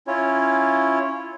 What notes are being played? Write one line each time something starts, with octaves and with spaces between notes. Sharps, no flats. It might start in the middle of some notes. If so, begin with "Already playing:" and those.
C#4 E4 F4 C#5